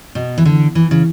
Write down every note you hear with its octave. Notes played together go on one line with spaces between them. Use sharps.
B2
E3
D3
E3
C#3